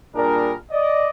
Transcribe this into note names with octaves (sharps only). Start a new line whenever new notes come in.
A#2 G3 D4 G#4 A#4
D5 D#5